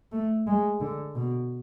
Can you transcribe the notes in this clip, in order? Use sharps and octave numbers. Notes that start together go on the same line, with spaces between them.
A3
G#3
D3
B2